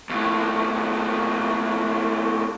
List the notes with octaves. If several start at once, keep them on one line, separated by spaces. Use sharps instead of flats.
D#2 A2